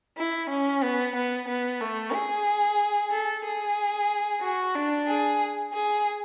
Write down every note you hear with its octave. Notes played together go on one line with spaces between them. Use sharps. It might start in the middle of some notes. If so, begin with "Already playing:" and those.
E4
C#4
B3
B3
B3
A3
G#4
A4
G#4
F#4
D4
G#4
G#4